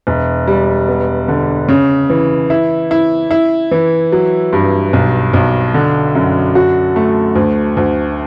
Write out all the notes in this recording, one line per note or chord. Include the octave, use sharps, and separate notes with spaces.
E1
G3
B3
D3
C#3
E3
E4
E4
E4
E3
F#3
G2
B1
B1
D3
F#2
F#4
A3
D2
D2